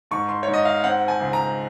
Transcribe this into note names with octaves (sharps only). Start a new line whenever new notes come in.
G#2 C#6
C6
C#5
G#2
D#5
F5
C4 F#5
G#5
C#2
A#5